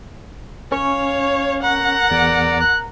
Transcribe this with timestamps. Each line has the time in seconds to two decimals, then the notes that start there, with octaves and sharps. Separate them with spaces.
0.72 C#4 C#5 F5 C#6
1.63 A#4 F#5 A#5
2.11 E2 D5
2.60 F#6